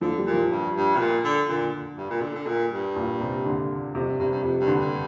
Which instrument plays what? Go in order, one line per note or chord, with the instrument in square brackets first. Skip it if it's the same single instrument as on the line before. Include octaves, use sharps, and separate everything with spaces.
[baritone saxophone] D3 [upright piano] F3
[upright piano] G3
[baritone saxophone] A#2
[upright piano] F3
[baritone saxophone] G2
G2
C3
A#2
D3
[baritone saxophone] A#2 [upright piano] D3
[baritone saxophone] G2
A#2
D3
D3
A#2
G2
[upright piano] A#2
C3
D3
[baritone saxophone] F2 [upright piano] C3
[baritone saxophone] G2
[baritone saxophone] G2 [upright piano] C3
[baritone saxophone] G2
[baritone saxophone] F2 [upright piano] C3
[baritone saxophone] G2
[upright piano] D3
[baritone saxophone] G2